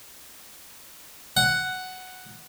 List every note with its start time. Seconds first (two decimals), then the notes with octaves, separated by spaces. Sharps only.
1.37 F#5